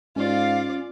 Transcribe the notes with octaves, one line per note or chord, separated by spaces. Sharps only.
G#2 C#4 F4 D5 F5